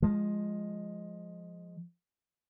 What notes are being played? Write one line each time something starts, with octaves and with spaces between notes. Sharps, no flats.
F3 G#3